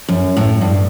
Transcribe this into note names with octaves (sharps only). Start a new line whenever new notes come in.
F#2
A2
G2